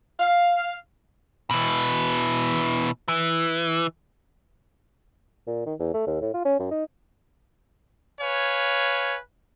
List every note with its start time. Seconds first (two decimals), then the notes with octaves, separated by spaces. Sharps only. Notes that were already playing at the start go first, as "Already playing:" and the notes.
0.20 F5
1.51 B2 E3
3.08 E3
5.47 A#2
5.66 D#3
5.80 E2
5.94 A3
6.07 D#2
6.22 A2
6.34 F4
6.45 C#4
6.60 F#2
6.71 D#4
8.21 B4 C#5 F5 G#5